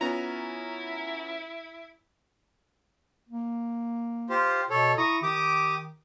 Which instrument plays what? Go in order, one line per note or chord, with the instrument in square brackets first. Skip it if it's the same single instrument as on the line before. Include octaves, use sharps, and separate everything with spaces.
[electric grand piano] B3 C#4 [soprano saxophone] E4 [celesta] F4 [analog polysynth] A#5
[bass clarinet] A#3
[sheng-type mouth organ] F4 G4 C5
[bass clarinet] B2 [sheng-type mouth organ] A4 C#5
[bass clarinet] E4 [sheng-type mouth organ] A#5 C#6 D#6
[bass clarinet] D#3 [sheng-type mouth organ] G4 D6 D#6